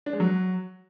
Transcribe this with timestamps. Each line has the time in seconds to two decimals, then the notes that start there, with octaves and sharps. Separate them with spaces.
0.06 D4
0.13 G#3
0.20 F#3